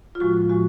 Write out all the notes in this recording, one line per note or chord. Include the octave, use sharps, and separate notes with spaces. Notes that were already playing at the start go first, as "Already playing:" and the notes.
F4
A2 F3 G#3 F#4
A2 F3 G#3 F#4